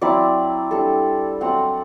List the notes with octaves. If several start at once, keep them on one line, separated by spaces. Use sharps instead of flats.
F#3 C4 E4 D5
G3 D4 A4
F#3 A3 C4 F#5